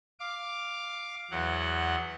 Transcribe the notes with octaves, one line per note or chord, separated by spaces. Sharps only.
F5 D6
E2 F#3 F#5